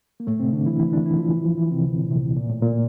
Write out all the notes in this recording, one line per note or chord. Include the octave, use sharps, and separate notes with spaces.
A#3
A2 A3
C3 C4
D3 D4
E3 E4
E3 E4
D3 D4
E3 E4
F3 F4
E3 E4
F3 F4
E3 E4
C3 C4
D2 D3
A#2
C2 C3
A#2
A2
A#2